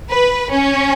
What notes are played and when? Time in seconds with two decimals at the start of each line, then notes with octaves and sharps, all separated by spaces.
0.11 B4
0.50 C#4